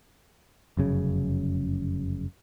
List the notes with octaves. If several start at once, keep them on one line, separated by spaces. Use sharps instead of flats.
F1 F#2 C#3